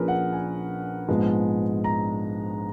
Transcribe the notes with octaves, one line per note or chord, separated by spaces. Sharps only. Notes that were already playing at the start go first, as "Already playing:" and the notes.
Already playing: A#1 A#2 F3 A#3 C#4 G#4 A#4 B4
F#5
G#5
A#1 G#2 F3 G#3 B3
A#5